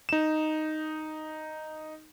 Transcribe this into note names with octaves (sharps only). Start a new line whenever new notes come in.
D#4 E7